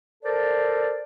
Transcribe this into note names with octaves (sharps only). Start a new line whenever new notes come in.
A4 A#4 C5 D5